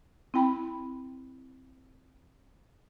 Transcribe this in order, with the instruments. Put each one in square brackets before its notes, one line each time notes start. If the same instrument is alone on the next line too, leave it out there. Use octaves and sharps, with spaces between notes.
[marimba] C4 E4 G5 B5